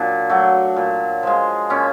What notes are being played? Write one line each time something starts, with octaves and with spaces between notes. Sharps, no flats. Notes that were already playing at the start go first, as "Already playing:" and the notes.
Already playing: A#2 F#3 D4
F#3 A3
A#2
F3 G#3
A#2 C#4